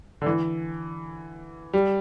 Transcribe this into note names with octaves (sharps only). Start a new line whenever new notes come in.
D3
E3
G3